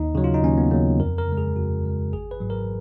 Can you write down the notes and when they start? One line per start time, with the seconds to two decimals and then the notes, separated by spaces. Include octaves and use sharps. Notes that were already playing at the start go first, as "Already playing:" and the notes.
Already playing: D#2 D#4
0.15 C#3 F#3
0.24 F4
0.34 D#4
0.43 D#2 C#4
0.58 B3
0.71 C#3 F#3 A#3
1.00 F2 A#4
1.18 A#4
1.28 C#3 G#3
1.37 G#4
1.56 F2 F#4
1.84 C#3 G#3
2.13 G#1 G#4
2.31 B4
2.40 G#2 F#3
2.50 A#4